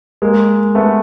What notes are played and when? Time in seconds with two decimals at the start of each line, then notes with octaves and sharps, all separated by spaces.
0.22 G#3 A#3
0.75 A3 B3